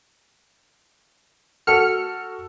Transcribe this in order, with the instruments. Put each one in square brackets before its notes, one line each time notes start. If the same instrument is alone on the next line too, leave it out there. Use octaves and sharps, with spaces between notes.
[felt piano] F#4 A4 [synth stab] F6 C#7